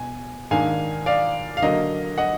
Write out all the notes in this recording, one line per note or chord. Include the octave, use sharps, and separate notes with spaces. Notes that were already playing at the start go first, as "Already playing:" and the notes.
Already playing: B2 G#5
G#2 D#3 A#3 D4 F5 G#5
D5 F5
F5
D3 F#3 A#3 D#5
D#5 F#5